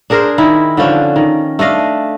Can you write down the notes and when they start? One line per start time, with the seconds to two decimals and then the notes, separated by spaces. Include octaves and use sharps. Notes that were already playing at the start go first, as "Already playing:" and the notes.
0.10 D4 G#4 A#4 C5
0.38 D#3 E4
0.77 D3 F3 C#4 D4
1.16 D#3
1.59 A3 D4 D#5 F5